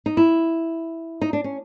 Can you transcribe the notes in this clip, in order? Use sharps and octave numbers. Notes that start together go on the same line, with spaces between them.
D#4
E4
D#4
D4
C#4